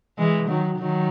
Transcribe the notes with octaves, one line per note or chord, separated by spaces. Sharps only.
E3 G#3
D#3 F#3
D#3 F#3